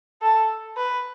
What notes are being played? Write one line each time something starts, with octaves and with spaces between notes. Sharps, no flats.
A4
B4